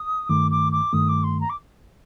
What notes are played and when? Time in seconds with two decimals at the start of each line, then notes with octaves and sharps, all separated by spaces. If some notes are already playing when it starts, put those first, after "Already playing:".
Already playing: D#6
0.29 G2 D#3 A3 D6
0.51 D6
0.72 D6
0.93 G2 D#3 A3 D#6
1.08 D6
1.23 C6
1.40 A#5
1.49 D6